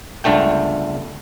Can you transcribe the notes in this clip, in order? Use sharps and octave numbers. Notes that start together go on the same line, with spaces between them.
G1 C#2 D3 A3 G5